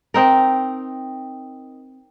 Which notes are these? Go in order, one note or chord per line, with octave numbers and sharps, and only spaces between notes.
C4 D#4 A#4